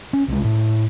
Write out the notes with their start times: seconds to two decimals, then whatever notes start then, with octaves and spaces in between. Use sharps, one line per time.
0.13 C#4
0.28 C2 G#3
0.44 A2